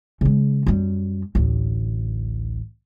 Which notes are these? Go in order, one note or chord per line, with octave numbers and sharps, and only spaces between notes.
C#3 G#3
F#2 G3
A1 D2